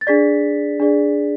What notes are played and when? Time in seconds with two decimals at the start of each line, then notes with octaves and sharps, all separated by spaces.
0.01 A6
0.07 D4 G#4 D5 B6
0.80 D4 G#4 D5